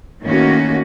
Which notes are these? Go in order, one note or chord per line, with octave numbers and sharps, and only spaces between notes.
A2 D#3 A#3 C#4 F#4